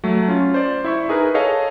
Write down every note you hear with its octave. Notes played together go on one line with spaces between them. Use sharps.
F#3 A3
C#4 F4
C5 D5
E4 E5 C#6
D#4 G#4 A#4 B4
G#4 A4 C#5 D#5 F5 A5